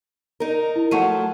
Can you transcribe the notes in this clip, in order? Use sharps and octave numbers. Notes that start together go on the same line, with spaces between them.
D#4 A#4
E4
F3 F#3 A3 F#5 C#6 D#7